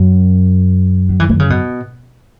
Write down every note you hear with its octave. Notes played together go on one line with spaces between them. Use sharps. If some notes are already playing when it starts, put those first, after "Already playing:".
Already playing: F#2
F#3
E3
D#3
C#3
B2